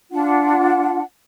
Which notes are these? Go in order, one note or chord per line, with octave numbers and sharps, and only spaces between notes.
D4 F4 F#5